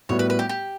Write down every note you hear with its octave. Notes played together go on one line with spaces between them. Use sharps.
A2 G3 B3 F#4 C#5
B4
B4
G4
G4